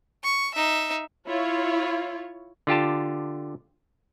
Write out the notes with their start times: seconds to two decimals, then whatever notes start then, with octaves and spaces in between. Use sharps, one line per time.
0.24 C#6
0.54 D#4 E5
1.27 E4 F4 C#5
2.67 D3 F4 G4 A5